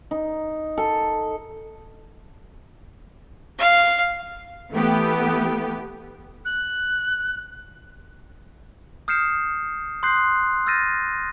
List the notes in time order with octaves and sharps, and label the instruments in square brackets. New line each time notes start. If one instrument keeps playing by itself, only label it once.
[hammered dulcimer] D#4
A4
[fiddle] F5
[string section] E3 A3 B3 G4
[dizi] F#6
[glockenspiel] D#6 F6 G6 C7 C#7 E7
C6 D#6 F#6 G6 C7
E6 F6 G6 A6 A#6 D#7